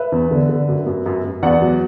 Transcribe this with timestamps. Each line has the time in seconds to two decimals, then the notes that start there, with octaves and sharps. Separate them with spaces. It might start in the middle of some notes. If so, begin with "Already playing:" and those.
Already playing: B4 E5
0.12 E2
0.31 D3
0.49 D3
0.68 F#2
0.86 F#2
1.06 F#2
1.24 F#2
1.43 E2 D5 F#5
1.62 F#3